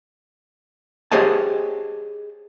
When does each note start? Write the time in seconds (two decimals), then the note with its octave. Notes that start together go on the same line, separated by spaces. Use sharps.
1.12 G4 G#4 C5 C#5 D#5 A5